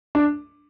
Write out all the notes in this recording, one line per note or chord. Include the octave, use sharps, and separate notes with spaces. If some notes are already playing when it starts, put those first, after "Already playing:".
D4